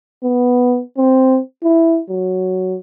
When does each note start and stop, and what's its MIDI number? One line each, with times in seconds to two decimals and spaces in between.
0.23 0.82 59
0.97 1.39 60
1.63 2.00 64
2.09 2.77 54